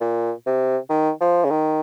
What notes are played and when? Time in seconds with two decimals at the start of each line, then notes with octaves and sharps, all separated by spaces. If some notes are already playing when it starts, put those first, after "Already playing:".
0.01 A#2
0.47 C3
0.90 D#3
1.21 F3
1.45 C#3
1.50 D#3